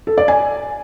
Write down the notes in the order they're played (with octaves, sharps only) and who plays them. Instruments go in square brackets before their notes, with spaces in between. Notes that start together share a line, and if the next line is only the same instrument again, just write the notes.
[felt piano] A4
D5
G#5